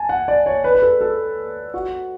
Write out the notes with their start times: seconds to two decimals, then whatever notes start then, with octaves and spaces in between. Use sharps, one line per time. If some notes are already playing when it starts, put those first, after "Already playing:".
Already playing: G#5 A5
0.09 F#5
0.28 D5
0.46 C#5
0.64 B4
0.75 B4
0.82 A4
1.01 A4
1.74 F#4